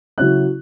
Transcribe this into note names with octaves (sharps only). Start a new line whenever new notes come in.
C#3 F#3 C#4 E4 F#6